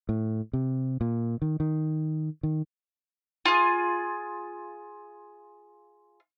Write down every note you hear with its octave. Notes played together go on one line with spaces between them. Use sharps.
A2
C3
A#2
D#3
D#3
D#3
F4 G#4